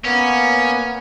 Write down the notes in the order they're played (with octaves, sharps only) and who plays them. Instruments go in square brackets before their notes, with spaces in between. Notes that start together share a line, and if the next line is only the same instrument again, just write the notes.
[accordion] A#3 B3 [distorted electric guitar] C#4